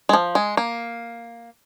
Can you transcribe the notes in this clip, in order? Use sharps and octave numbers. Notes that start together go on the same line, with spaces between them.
G#3
F3
G#3
A#3